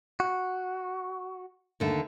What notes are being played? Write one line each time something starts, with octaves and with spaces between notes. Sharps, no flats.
F#4
D#2 D3 A3